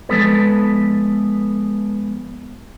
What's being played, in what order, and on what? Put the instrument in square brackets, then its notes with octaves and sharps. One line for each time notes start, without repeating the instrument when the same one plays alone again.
[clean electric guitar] F3 G#3 B3 A4 B4